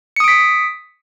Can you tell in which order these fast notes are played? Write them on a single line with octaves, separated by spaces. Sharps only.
C#7 D#6 D7 B6